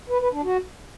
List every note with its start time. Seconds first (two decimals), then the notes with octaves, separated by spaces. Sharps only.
0.10 B4
0.21 B4
0.32 D4
0.44 F#4